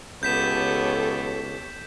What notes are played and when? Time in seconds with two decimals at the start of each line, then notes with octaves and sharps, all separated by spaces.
0.23 C#2 B3 G4 A4 C#5 G6 B6 E7